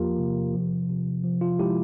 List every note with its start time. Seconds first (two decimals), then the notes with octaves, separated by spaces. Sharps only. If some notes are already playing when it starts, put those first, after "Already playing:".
Already playing: E2 F3 A#3 F4 G4 A#4
0.19 C3
0.54 F3
0.89 C3
1.24 F3
1.41 F4
1.59 G#3 E4 G4